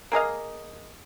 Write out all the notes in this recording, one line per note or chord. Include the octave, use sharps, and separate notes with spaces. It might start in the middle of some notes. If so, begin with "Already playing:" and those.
A#3 G#4 D#5 F5